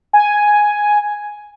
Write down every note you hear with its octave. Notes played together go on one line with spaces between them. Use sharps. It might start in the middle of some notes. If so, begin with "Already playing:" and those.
G#5